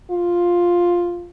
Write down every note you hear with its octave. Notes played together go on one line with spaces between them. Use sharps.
F4